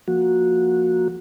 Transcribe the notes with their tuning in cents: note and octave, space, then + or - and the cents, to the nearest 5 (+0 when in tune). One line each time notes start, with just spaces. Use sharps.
F3 +0 A#3 +0 F#4 -10